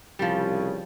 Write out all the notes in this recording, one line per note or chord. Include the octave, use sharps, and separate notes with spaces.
C2 C#3 F3 G3